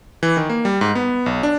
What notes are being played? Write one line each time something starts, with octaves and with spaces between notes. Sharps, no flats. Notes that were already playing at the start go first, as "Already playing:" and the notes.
E3
D#3
A#3
G3
G#2
B3
B1
D4